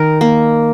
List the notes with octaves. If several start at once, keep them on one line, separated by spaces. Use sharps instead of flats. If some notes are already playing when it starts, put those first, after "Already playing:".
Already playing: D#3 A#4
A#3